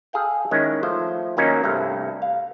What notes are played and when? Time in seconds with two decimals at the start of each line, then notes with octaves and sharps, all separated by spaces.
0.13 G#4 A4 F5 G5
0.51 D#3 G#3 C#4 E4
0.83 F3 A3 C5
1.37 D#3 F#3 A#3 C#4 D#4
1.64 C2 G2 A3
2.22 F5